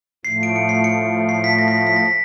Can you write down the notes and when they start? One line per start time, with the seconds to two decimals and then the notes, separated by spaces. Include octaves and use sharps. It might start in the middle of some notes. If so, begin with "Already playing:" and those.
0.25 A2 F3 A3 C7
0.43 D7
0.56 C#7
0.69 C7
0.84 C#7
1.29 C7
1.44 B6
1.59 A#6
1.68 B6
1.78 A#6
1.87 B6
1.96 A#6
2.06 B6